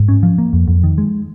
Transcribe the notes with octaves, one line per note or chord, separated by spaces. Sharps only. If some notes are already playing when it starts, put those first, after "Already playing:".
Already playing: G#2
C#4
F3
A#3
F2
F2
D#3
G#3